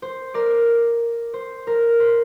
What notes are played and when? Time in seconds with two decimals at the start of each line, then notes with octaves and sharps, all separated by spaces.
0.02 C5
0.34 A#4 D5
1.34 C5
1.67 A#4
2.00 C5